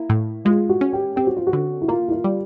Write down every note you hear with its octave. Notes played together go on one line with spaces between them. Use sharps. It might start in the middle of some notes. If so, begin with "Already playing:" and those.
Already playing: A#3 E4
A2
G#3 F4
F#4
C#4
G4
C4 G4
F#4
F4
F#4
D3
E4
A#3 F4
E4
F4
G3